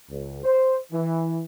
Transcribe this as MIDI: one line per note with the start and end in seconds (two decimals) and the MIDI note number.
0.11 0.43 37
0.44 0.78 72
0.93 1.43 52